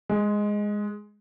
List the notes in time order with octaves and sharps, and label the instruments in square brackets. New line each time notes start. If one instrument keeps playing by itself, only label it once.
[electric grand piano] G#3